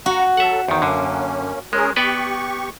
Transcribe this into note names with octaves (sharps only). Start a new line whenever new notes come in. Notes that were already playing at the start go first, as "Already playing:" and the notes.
F#4 F#5 A#5
F#3 A4 E5 F#5
E2 D#3 C5 G5
F#2 D3 A#3 C#4
G#3 C#4 G#4 A#4
B3 G4 B4 D5 C#6